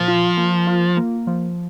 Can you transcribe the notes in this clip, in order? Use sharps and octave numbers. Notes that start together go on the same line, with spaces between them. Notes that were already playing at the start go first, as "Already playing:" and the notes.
Already playing: A#2 F3
F4
A#3
F4
A#3
F3